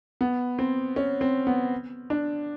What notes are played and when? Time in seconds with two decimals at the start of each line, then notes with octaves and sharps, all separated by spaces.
0.21 B3
0.59 C4
0.96 C#4
1.21 C4
1.47 B3
2.10 D4